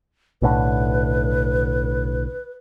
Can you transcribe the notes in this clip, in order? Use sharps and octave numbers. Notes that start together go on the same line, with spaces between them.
B1 A2 D3 B4